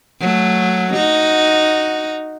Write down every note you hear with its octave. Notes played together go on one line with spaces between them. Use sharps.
F#3 A3
D#4 F#4